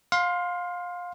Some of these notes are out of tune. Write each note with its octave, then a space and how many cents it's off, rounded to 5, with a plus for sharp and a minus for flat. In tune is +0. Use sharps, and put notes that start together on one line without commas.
F5 +25 C6 +0